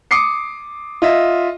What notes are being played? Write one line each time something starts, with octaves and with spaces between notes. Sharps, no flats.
D6 D#6 C7 C#7
F4 D#5 E5